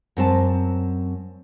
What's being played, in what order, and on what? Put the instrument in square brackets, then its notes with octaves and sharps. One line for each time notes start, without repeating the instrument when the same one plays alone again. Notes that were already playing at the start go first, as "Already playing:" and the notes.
[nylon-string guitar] F#2 C4 A5